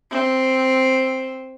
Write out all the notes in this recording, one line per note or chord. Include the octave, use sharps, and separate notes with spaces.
C4